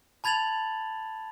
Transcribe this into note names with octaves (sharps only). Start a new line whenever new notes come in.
A5 B5 G#6 A6 F7 F#7